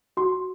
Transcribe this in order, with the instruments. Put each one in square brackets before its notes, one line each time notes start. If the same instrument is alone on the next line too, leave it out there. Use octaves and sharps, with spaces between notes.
[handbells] F#4 C6